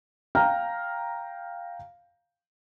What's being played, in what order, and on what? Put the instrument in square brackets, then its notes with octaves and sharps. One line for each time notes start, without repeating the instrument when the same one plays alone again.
[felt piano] F5 G5 A#5 F6